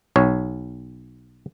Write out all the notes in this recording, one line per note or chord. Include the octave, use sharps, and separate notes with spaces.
B1 C#5